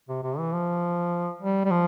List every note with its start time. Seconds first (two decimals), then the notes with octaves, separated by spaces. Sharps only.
0.09 C3
0.23 C3
0.38 E3
0.53 F3
1.42 G3
1.65 G3
1.71 F3